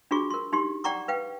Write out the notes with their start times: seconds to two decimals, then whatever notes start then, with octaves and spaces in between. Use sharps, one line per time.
0.11 D4 F4 F#4 G#4 C#6
0.30 A#4 C6
0.52 D#4 G4 C6
0.84 D5 F#5 G5 A#5 C#6 D6
1.08 B4 F5 G5